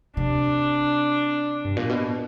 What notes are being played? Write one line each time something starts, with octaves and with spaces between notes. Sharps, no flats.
C3 D4
G2
A#2
B2